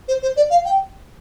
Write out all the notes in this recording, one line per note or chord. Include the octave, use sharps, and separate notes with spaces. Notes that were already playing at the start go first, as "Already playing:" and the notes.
C5
C5
D5
F5
G5